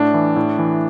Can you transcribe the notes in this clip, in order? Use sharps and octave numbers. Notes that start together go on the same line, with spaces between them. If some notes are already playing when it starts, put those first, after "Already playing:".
Already playing: A2 D4
E3
A2
E3